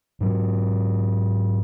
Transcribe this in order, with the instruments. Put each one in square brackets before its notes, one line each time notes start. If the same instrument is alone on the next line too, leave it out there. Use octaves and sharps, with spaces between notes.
[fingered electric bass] G#2 F#3